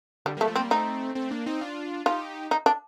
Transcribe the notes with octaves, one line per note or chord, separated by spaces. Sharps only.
D3 G3
G3 A3 A#3
F3 A3
C4
G3 A#3
A3 C4 D#4
A3 C4
A#3 D4
C4 D#4
D4 F4
D#4 F4 G4
D#4
D4